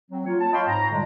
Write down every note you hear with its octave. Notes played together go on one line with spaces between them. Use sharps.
F#3 C4
A#3 F4 C#5
A5
C#5 D#5 F5 G5 B5 C6
G#2 A#5
A#2 D3 G3 G#3